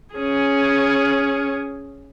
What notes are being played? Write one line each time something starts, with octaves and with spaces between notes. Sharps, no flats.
C#4 G#4